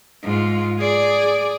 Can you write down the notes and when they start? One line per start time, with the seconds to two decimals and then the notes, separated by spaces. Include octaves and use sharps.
0.24 G#2 F4
0.80 G#4 D5